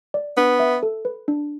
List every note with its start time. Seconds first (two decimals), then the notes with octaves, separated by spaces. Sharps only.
0.14 D5
0.37 B3 D4
0.60 E5
0.83 A4
1.05 B4
1.28 D4